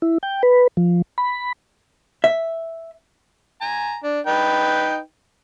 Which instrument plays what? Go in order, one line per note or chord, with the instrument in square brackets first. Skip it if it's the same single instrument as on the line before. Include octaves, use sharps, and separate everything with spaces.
[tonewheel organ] E4
G5
B4
F3
B5
[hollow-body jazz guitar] E5
[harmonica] G#5 A#5
D4
D#4 B4 G5